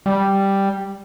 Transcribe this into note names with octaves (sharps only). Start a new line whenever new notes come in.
G3